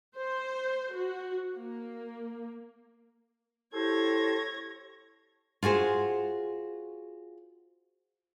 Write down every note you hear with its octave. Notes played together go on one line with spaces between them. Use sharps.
C5
F#4
A#3
E4 G4 A4 C5 C#5 G#6 A#6
F4 F#4 G#4 C5